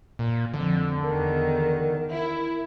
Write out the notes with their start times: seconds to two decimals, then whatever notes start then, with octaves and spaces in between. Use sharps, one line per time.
0.19 A#2
0.54 F2 D3
1.03 E2 D#3 A#4
2.12 E4